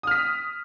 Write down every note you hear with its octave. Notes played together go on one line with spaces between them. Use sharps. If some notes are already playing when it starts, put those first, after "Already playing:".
D#6 F6 B6